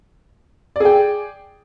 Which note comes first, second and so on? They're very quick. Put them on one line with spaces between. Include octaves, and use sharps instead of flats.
D5 G#4 G5